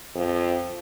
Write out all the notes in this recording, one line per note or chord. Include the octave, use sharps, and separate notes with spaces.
F2